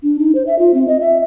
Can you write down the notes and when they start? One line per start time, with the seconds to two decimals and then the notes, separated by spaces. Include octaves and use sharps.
0.03 D4
0.19 D#4
0.35 C5
0.47 E5
0.59 F4
0.74 C4
0.88 D#5
1.01 E5